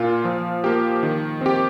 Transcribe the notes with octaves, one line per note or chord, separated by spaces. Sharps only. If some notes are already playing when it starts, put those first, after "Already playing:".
Already playing: A#2 A#3 F4
F3
A#3 G4
D#3
C4 G4